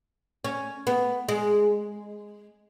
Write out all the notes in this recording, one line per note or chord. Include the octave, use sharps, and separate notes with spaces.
C#4
B3
G#3